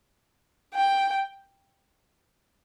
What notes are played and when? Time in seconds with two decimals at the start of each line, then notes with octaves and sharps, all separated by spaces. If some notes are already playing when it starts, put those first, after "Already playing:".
0.74 G5